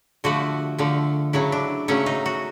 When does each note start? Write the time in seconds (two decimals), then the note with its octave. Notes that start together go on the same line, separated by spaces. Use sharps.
0.24 D3 F3 A3 F#4
0.78 D3 F3 A3
1.33 C#3 F#3 A3 E4
1.52 D4
1.88 C#3 F#3 A3 C#4
2.06 D#4
2.26 F#4